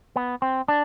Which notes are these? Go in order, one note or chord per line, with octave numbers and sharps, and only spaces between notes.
B3
C4
D4